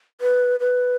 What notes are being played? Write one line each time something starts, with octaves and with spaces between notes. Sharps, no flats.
B4
B4